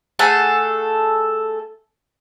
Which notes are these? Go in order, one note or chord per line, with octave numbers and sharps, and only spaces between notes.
A3 G#4 A4 F#5